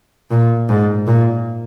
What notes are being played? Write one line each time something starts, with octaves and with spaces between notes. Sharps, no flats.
A#2
G#2
A#2